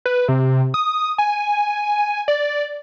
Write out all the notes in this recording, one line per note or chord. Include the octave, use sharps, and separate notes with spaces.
B4
C3
D#6
G#5
D5